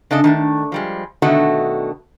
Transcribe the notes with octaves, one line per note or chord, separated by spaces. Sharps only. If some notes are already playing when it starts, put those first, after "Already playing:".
C#3 D4 A4 D#5
D#3 A3 D4
F3 G3 G#3
B2 D3 D#3 A3 F#4 D#5